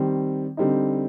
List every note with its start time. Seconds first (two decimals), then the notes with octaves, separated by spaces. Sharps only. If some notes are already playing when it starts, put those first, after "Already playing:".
Already playing: D#3 G3 C4
0.57 D3 G3 C4 D#4